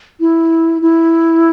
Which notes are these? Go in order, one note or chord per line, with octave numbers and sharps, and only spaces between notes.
E4
E4